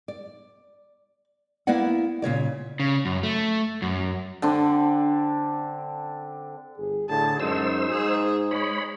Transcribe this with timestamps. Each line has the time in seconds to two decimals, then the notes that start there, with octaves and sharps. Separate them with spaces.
0.08 D5
1.67 A#3 B3 E4 B4 D5 F#5
2.22 A#2 C#3 C#5 D5
2.80 C#3
3.05 F#2
3.23 A3
3.82 F#2
4.42 D3 C4 D4
6.78 G1 G#4
7.09 A2 D3 G#4 A5
7.40 F#2 G#3 D#4 C5 E6
7.89 G#2 G#4
8.51 G#3 C#5 B5